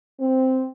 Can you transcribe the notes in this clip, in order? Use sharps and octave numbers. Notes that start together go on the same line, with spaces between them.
C4